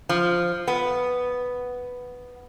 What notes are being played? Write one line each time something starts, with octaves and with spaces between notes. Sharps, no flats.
F3
B3